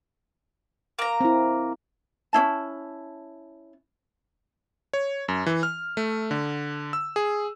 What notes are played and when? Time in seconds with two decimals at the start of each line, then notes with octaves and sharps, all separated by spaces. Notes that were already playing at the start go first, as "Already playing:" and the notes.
0.99 A#3 A#5
1.20 C4 E4
2.33 C#4 D4 E4 A5
4.93 C#5
5.28 F#2
5.46 E3
5.63 F6
5.97 A3
6.31 D3
6.93 E6
7.16 G#4